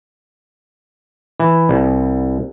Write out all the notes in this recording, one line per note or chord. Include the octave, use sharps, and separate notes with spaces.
E3
C2